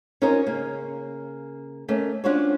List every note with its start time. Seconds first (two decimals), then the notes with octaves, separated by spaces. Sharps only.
0.22 C#4 D#4 F4 A#4 C5 D#5
0.46 C#3 A#3
1.89 A3 A#3 C#4 D#5
2.24 C#4 D4 F4 F#4 C5 C#5